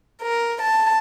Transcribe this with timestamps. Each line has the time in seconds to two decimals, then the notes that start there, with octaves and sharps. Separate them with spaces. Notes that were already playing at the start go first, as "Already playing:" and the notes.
0.21 A#4
0.60 A5